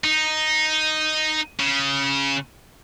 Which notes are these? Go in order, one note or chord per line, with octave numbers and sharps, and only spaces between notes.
D#4
C#3